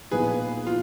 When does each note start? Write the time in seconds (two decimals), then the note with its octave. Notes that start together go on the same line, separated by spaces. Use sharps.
0.11 A#2 F3 B3 D#4 G#4 B4
0.67 F4